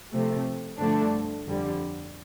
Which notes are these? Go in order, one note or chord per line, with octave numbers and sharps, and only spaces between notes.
C3 F3 A3
G2 D3 F3 A3 D4
F2 D3 G3